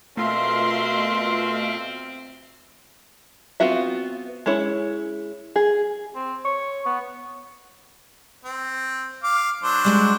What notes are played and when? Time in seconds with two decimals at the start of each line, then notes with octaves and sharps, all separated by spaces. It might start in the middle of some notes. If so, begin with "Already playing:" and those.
0.17 B2 A3 C4 F4 A#4 E5 F5 C6
3.60 B3 C4 F4 F#4 E5
4.46 G#3 C#4 E4 C#5
5.56 G#4
6.15 C4
6.45 C#5
6.86 B3
8.45 C4
9.23 F5 D6
9.63 F#3 D4 C5
9.85 G3 G#3 B3